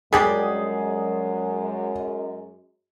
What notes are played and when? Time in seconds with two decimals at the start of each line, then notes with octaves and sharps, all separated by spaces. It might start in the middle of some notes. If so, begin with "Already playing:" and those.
0.13 F#2 G3 G#3 D4 G4 G#4